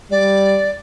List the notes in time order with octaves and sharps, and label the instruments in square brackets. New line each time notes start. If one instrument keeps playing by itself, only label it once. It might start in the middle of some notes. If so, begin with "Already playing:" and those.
[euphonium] G3 [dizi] D5